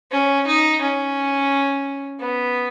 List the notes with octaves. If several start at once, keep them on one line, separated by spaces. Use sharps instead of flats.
C#4
D#4
C#4
B3